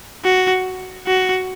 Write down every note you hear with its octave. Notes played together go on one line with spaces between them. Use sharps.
F#4
F#4